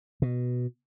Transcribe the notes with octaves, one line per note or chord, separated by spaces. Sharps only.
B2